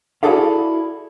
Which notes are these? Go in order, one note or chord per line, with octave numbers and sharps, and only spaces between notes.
E4 F#4 G#4 A4 D5 F5